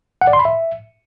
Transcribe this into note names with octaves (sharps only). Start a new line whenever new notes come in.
F#5
D5
C6
B5
E5